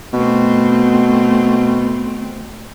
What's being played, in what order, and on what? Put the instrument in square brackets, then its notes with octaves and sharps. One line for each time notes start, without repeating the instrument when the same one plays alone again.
[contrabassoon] B2 [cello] A3 C4